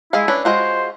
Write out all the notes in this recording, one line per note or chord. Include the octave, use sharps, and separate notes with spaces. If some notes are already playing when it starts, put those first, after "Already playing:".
G#3 E4 G#4 F5
C#4 D4 B4
G#3 F4 F#4 C5